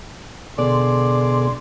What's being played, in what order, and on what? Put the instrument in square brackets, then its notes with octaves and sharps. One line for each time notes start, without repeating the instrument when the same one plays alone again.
[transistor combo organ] B2 G#4 [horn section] D3 D5 C6